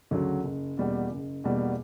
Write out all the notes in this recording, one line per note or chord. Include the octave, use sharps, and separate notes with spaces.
D2 C#3 F#3
F#1
E2 B2 G3 A#3
F#1
E2 B2 G3 A#3